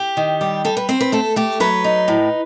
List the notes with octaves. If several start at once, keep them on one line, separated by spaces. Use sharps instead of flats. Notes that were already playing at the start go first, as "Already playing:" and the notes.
Already playing: G4
D#3
G3
G3 A4
B4
C4 C5
B4
A3 A4
A3 G4
F#3 B4
D#4
A2